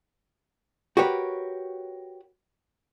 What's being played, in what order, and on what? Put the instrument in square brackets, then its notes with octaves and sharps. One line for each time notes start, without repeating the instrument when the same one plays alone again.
[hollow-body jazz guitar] F#4 G4 A#4 B4 C#5